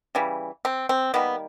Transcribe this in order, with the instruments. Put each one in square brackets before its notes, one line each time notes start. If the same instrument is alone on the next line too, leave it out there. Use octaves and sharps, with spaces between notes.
[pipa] C#3 E3 G3
C4
C4
D#3 G3 A#3 B3